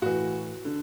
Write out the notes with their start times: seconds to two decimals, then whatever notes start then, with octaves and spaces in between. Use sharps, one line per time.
0.02 A2 E3 F#4
0.65 D3